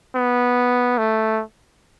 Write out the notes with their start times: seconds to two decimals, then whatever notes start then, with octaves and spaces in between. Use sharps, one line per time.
0.15 B3
0.98 A3